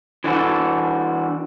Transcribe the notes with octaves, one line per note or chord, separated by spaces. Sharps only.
E3 D4 F#4 A4